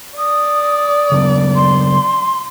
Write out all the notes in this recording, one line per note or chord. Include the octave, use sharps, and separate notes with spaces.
D5 D#6
C#3 F#3 B3
C6